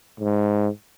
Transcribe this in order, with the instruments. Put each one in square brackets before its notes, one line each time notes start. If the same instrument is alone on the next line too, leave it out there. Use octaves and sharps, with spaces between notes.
[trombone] G#2